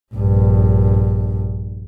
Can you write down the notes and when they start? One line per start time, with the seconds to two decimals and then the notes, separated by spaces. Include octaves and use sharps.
0.14 A#1 G2